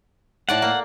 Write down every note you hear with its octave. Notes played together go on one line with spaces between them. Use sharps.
A2 D5 F#5 A5
A#3